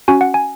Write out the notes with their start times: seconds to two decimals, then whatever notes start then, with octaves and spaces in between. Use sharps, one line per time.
0.08 C#4 F#4 G#5
0.21 F#5
0.34 G#5